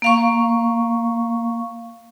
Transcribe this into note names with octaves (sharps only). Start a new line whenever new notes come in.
A#3 F5 C#6